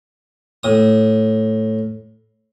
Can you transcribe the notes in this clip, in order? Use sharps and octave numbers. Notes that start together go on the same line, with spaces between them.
A2 D#6